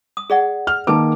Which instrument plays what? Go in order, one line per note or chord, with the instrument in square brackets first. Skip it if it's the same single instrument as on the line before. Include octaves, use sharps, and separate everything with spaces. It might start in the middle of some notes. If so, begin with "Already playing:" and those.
[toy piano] D#6
G#4 D5 F#5
[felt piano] F6
[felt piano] D#3 A#3 D6 [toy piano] B4 A5